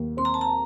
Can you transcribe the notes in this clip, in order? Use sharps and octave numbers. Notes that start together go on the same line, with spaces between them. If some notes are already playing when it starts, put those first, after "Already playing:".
Already playing: D#2
C4 C6
A#5
A5
A#5